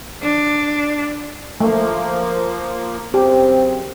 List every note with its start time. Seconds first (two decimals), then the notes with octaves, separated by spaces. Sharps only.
0.23 D4
1.61 F3 A3 A#3
3.14 F#2 C#3 C4 G4